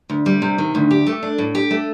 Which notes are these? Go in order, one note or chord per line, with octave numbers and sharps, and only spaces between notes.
D2
G3
C3
D#3
D2
G4
A3
D4
A2
G4
A3